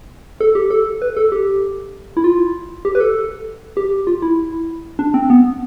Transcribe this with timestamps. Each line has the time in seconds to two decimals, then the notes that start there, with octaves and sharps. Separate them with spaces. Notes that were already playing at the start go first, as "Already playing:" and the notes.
0.40 A4
0.55 G4
0.70 A4
1.02 B4
1.17 A4
1.32 G4
2.17 E4
2.24 F4
2.85 G4
2.95 B4
3.00 A4
3.77 G4
4.07 F4
4.22 E4
4.99 D4
5.14 C4
5.30 B3